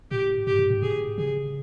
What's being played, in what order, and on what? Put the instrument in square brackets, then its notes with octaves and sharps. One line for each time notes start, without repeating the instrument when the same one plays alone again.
[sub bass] A2 [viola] G4
[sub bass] G#2 [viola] G4
[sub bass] G#2
G#2
[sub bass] A2 [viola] G#4
[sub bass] C#3 [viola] G#4